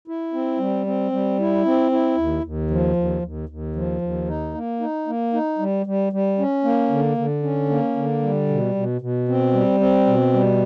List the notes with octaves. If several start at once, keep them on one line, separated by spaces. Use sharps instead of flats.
E4
C4
G3
C4
G3
E4
C4
E4
D#2
D#2
F3
D#2
D#2
D#2
F3
D#2
D#4
A#3
D#4
A#3
D#4
G3
G3
G3
C#4
A#3
D3
D3
C#4
A#3
D3
G3
B2
B2
B2
C4
G3
C4
B2
G3